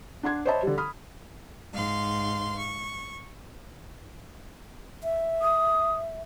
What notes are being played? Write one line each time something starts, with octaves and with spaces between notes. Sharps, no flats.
D4 F#5 C6 G#6
C5 C#5 D#5 E5 A5 B5
D3 G3
B5 D#6 F6
G#2 F5 C6
C#6
E5
D#6